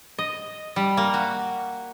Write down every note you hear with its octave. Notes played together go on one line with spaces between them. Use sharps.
D#5
G3
A#3
F#4